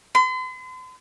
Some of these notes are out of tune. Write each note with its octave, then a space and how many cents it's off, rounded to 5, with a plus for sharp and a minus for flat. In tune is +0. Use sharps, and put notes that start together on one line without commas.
C6 -45